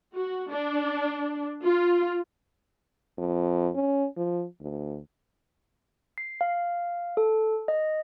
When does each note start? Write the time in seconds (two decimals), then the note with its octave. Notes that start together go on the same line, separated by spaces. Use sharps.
0.13 F#4
0.50 D4
1.62 F4
3.18 F2
3.75 C#4
4.17 F3
4.61 D2
6.18 C7
6.41 F5
7.17 A4
7.68 D#5